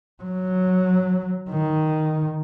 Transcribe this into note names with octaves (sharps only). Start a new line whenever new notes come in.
F#3
D#3